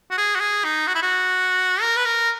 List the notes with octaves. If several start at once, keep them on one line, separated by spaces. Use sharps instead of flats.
F#4
G#4
F#4
G#4
D#4
F#4
E4
F#4
A#4
B4
A#4